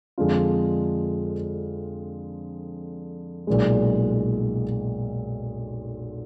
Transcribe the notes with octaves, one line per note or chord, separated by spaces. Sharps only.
F2 D3 G#3 D4 F4
B1 A#2 G#3